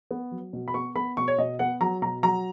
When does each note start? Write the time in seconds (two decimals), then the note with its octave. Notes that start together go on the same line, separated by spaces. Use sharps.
0.11 B3
0.31 F#3
0.53 B2
0.68 B5
0.74 B3 C#6
0.96 B3 B5
1.17 B2 C#6
1.28 C#5
1.38 B2 D#5
1.59 B3 F#5
1.81 F#3 A#5
2.02 B2 A#5
2.23 F#3 A#5